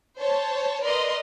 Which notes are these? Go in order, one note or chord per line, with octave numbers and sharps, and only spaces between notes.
C5 C#5 A5
A#4 B4 D5 D#5 C6